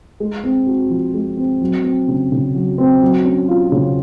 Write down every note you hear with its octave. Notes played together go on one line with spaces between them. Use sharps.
G#3
C4
F#4
F3
G#3
C4
F#3
C4
C#3
C#3
F#3
C4
F#3
C#4
F4
C#3